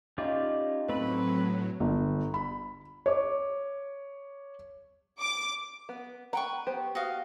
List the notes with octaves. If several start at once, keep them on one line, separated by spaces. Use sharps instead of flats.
C#4 D#4 F4 G4 D5
A2 F#3 A3 C4 B4 B5
G1
B5
C#5 D6
D6
B3
B4 F#5 G5 A#5 C#6
B3 G4 C5
F#4 D#5 F5